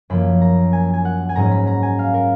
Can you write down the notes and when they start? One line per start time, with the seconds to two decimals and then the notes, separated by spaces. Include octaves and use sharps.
0.10 F#2 F3 A#3 B5
0.42 A#5
0.73 G#5
0.93 G#5
1.05 F#5
1.29 G#5
1.36 G#2 F#3 C#4 A#5
1.51 B5
1.67 A#5
1.83 G#5
1.99 F5
2.14 A#4